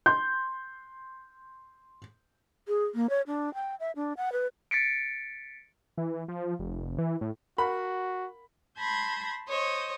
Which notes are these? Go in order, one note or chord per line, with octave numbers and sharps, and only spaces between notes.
C6 G6
G#4
A#3
C#5
D4
G5
E5
D4
F#5
B4
A6 B6 C#7 D7
E3
F3
F1
E3
A2
F#4 A#4 F#5 B5
A5 B5 C6 G6 G#6 A#6
C5 C#5 D#5